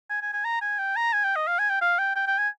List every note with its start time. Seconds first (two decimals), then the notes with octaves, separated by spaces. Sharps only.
0.10 G#5
0.22 G#5
0.33 G#5
0.44 A#5
0.62 G#5
0.79 G5
0.96 A#5
1.13 G#5
1.24 G5
1.36 D#5
1.47 F5
1.59 G#5
1.70 G5
1.81 F5
1.99 G5
2.16 G5
2.27 G5
2.38 G#5